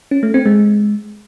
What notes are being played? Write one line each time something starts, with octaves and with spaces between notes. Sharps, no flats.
C#4
A3
C4
G#3